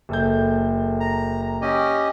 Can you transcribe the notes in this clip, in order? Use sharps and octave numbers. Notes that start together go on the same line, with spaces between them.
F#1 A4 G6
A#5
C#4 G4 D#5